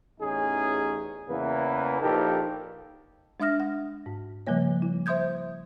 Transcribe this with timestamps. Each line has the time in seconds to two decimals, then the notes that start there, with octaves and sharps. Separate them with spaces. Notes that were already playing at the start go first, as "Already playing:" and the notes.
0.20 A1 E2 C#4 D#4 G#4
1.28 E2 C#3 E3 A#3 B4
2.01 A#1 D#4 G4 A4 A#4
3.40 G#3 D4 E5 D#6 F6 A#6
3.60 F#5
4.06 G#2
4.47 C#3 F3 G3 A#3 C#5
4.82 E4
5.06 C5 E5 C6 D#6 G6 G#6